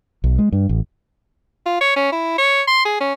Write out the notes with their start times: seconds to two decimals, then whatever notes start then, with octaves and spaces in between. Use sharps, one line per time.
0.24 B1
0.38 G#3
0.52 G2
0.69 A1
1.66 F4
1.81 C#5
1.96 C#4
2.12 E4
2.39 C#5
2.68 C6
2.85 G#4
3.01 C#4